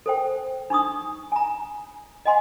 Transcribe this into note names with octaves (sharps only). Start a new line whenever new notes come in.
A4 C5 G5
D4 D#4 C#6 D#6
G#5 A#5
D#5 F#5 G#5 C6